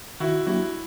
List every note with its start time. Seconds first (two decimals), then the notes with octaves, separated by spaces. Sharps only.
0.20 D#3 E4 F#4
0.46 F#3 A#3 D4 E4 F#4 G4